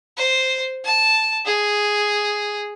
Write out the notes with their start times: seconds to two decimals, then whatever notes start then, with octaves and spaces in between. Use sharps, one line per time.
0.18 C5
0.85 A5
1.46 G#4